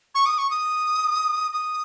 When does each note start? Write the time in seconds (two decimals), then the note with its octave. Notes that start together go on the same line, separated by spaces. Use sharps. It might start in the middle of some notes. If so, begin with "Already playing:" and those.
0.15 C#6
0.26 D#6
0.38 C#6
0.50 D#6
1.53 D#6